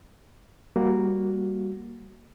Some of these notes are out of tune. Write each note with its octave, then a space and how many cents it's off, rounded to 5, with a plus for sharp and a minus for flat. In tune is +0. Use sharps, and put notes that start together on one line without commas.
G3 +0 A#3 +0 F#4 +0